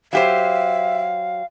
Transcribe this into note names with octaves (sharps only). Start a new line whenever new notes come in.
F#3 G4 C5 E5 F5